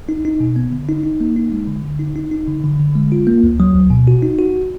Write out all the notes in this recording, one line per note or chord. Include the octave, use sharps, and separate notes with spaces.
D#4
D#4
B2
B3
D3
D#4
D#4
A#3
D#4
G#3
D3
D3
D#4
D#4
D#4
D3
D3
D3
G#3
F4
A#3
D2
F#3
D2
B2
F#4
D#4
F#4